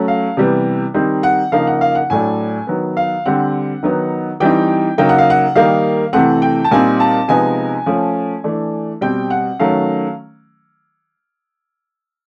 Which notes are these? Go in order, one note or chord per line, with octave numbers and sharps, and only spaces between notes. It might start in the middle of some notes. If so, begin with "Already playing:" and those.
Already playing: F#3 A3 C#4
F5
C3 E3 G3 B3
D#3 G3 C4 D#4
F#5
C#3 F3 A#3 D#4 F5
F#5
F5
F#5
A2 F#3 A3 D4 G#5
D#3 F#3 B3
F5
D3 G3 C4 F#5
D#3 F#3 B3 D#4
E3 G3 C4 D#4 G5
C#3 F#3 A#3 D#4 G5
F#5
F5
F#5
D#3 G3 A#3 D#4 F5
C3 E3 A3 C4 F#5
G5
A5
A#2 G3 C4 D#4 G#5
A5
C3 F3 G#3 B3 D#4 G#5
F3 A3 C#4
E3 A3 D4
B2 G3 C4 G5
F#5
D#3 F#3 A3 C#4 F5